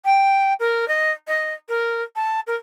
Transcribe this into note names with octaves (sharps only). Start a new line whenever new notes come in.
G5
A#4
D#5
D#5
A#4
A5
A#4